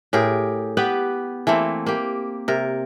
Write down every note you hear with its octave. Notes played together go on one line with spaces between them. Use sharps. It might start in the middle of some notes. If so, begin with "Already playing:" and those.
A2 G4 G#4 A#4
B3 G4 B4
E3 A3 A#3 C4
A#3 G4
C3 A#4